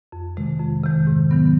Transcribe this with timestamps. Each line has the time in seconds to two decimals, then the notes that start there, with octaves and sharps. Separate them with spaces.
0.12 F2
0.37 C3 D#3 G#3
0.60 F2
0.84 C3 D#3 G#3
1.07 G#2
1.31 D#3 F#3 B3